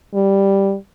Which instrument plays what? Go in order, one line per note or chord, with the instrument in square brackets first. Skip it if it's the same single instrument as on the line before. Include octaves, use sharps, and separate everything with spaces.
[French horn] G3